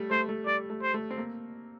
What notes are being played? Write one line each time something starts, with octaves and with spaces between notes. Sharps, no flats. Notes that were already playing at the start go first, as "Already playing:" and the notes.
Already playing: G3 A3
A3 C5
A3
G3 D5
A3
C5
A3
C4
A#3